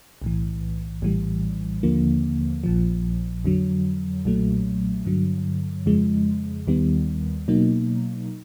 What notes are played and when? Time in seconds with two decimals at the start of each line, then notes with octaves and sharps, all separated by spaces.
0.22 B1 A2 E3
1.02 A#1 A2 E3 G3
1.83 D#2 D3 F3 A#3
2.64 A#1 A#2 F3
3.45 F2 D3 F#3
4.25 B1 A#2 F#3 A3
5.05 G2 D3 F#3
5.86 F2 C#3 F3 G#3
6.67 D#2 D#3 G3 B3
7.48 B2 F#3 A#3 D#4